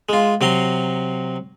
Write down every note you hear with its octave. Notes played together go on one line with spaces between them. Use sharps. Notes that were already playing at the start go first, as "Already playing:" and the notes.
G#3 F4
C3 F#3 A#5 C6